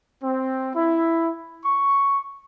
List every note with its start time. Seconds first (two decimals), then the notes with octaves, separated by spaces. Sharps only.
0.22 C4
0.75 E4
1.64 C#6